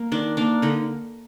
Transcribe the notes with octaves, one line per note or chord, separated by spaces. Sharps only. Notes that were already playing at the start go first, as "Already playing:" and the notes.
Already playing: A#3
D#3 D4
A#3 D4
D3 D#4